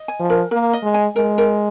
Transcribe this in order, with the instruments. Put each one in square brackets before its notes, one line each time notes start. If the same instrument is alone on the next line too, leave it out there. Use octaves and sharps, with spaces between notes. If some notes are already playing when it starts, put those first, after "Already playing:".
Already playing: [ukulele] D#5
G#5
[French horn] F3
[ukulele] A#4
[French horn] A#3 [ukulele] A#4
[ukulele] D#5
[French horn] G#3
[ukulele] G#5
[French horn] G#3 [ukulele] A#4
[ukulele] A#4